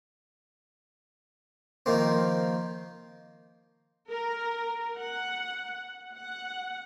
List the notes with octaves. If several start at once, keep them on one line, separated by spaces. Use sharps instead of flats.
D#3 F3 A#3 C4
A#4
F#5
F#5